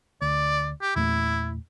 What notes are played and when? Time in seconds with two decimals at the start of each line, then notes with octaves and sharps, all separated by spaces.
0.22 D2 D5
0.82 G4
0.96 E2 A#2 A3 E4